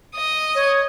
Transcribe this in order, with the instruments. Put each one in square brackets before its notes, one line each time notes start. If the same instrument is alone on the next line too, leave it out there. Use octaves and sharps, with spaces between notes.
[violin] D#5 D#6
[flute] C#5